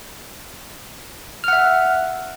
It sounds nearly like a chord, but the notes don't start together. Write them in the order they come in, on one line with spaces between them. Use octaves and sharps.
F6 F#5 E5